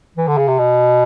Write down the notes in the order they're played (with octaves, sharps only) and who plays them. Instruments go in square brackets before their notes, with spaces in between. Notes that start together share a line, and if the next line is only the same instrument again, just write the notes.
[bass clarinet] E3
D3
C#3
C3
B2